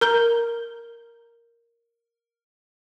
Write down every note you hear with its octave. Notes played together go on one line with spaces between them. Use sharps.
A#4 A#5 G6 G7